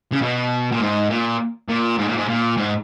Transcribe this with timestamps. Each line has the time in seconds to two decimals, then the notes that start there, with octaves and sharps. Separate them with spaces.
0.12 C#3
0.22 B2
0.72 A#2
0.80 G#2
1.10 A#2
1.68 A#2
1.98 G#2
2.07 A#2
2.15 G#2
2.28 A#2
2.57 G#2